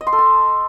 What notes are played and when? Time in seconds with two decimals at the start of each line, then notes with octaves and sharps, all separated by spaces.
0.01 D#5
0.07 C6
0.13 A4
0.19 A5